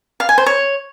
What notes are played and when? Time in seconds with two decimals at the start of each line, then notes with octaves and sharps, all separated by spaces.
0.20 F5
0.29 G#5
0.38 C5
0.46 C#5